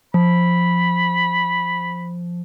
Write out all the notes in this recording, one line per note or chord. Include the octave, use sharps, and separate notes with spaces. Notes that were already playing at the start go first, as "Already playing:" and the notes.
F3 B5